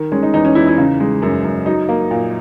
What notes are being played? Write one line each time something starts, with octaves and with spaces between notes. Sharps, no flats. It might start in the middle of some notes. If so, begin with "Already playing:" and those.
Already playing: D#3
G#3 C#4
D#4
E2 D#4
C#4
E2 E4
E4
C#3 D#4
G#3
F#2
F#2
F#3 D#4
A#3
A#2